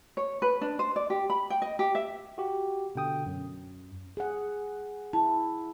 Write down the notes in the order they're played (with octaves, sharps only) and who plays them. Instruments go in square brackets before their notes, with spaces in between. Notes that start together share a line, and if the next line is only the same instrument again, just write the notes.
[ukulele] C#5
B4
D4
C5
D5
G4
B5
G5
D#5
G4
E5
[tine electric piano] F#4 G4
B2 D3 G5 D#6
F#2
[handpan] G#4 F#5
[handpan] E4 [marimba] A5